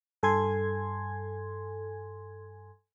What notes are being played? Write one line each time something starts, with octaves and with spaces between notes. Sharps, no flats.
G2 A4 G#5 C6 G#6